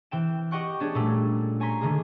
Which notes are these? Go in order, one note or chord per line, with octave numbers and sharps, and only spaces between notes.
E3 C4 G5 E7
G4 D#5 F#5 G5 C#6 F#6
B3 C#4 D4 G#4 C#5
A#2 F#3 G3 A3
C#5 G#5 A#5 C6 B6
D3 D#3 G#3 A#3 G#4